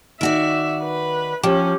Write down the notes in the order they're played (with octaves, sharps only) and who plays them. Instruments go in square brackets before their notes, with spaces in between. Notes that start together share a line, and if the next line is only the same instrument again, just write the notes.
[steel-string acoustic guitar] D#3 F#4 D5 [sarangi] E5
[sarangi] B4
[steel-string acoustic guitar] F3 [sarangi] C#4 [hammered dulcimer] G4